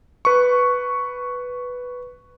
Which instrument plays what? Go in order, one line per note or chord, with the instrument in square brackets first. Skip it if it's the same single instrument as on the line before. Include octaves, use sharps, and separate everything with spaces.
[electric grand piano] B4 C#6